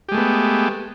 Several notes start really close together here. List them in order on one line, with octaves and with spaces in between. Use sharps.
G4 G#3 A3 B3